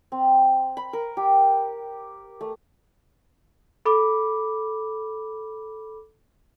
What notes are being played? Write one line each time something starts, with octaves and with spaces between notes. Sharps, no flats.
C4
B5
A#4
G4
A3
A4 B5 D6